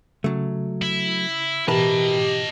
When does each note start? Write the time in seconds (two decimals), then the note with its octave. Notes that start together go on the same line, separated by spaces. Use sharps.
0.24 C#3 F#3 A3
0.82 E4
1.68 B2 E3 E4 G4 A#4 B4 D#5 A5